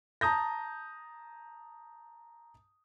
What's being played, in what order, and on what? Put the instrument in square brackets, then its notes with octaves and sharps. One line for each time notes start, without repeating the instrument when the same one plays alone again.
[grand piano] A5 A#5 D#6 G6 A#6